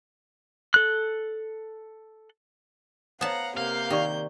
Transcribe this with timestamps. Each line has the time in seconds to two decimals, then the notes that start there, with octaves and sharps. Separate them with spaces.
0.74 A4 F#6
3.21 B3 C5 C#5 F5 F#5 A5 A#5
3.57 C3 A#3 F5 G6
3.90 D#3 G4 D5 C#6